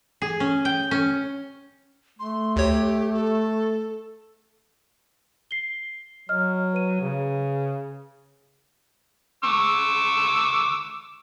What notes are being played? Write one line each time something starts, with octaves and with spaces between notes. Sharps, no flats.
G#4
C#4
G5
C#4
A3 C6
D2 G4 C#5
A4
C7 G7
F#3 D#5 F6
B4 D#7
C#3
C#6 D6 E6